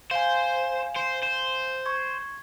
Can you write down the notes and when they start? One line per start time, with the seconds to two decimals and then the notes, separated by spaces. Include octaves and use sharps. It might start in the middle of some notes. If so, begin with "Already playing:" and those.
0.11 C5 F5 G#5
0.96 C5
1.22 C5
1.86 C6 C#6 G#6